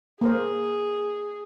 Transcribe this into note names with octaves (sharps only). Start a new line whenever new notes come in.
A#3 G#4 A#4 C5